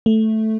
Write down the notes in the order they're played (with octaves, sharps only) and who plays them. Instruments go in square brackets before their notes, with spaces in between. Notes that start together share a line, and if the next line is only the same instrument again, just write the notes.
[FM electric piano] A3